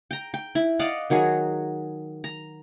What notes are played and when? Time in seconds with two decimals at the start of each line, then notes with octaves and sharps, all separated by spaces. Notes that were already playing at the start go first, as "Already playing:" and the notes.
0.11 G5 A#5
0.34 G5
0.55 E4
0.79 D5 D#5 F5 F#5
1.10 D#3 F#3 F#4 G#4
2.24 A#5